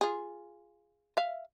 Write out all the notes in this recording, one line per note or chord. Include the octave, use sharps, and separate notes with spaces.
F4 G#4
E5 F5